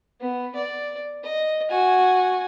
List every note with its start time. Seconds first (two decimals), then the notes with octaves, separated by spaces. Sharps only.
0.20 B3
0.55 D5
1.24 D#5
1.69 F#4 G#5